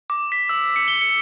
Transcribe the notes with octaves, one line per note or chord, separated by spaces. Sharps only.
D6
B6
E6
C#7
G7
C#7